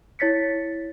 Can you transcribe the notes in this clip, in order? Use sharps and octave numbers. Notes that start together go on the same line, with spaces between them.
E4 C#5 A6 B6 C#7